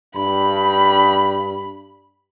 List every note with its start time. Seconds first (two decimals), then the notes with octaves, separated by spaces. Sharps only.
0.16 G2 B5